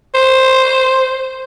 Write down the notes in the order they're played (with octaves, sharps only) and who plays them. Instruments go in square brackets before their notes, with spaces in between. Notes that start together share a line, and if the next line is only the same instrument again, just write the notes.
[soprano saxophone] C5